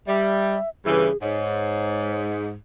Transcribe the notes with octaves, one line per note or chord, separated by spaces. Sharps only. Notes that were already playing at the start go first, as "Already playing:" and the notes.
G3 E5
G2 C#3 E3 G#4
G#2 C#5